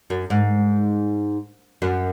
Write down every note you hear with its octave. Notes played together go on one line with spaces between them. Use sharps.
F#2
G#2
F#2